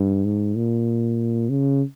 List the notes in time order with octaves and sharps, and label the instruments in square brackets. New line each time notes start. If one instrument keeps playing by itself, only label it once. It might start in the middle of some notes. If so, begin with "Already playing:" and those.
Already playing: [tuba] G2
G#2
A#2
C#3